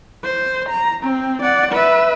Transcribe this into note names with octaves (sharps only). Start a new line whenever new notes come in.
C5
A#5
C4
D5 F#5
B4 E5